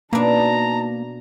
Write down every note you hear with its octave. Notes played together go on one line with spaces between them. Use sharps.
B2 A#3 D4 D#4 A5 A#5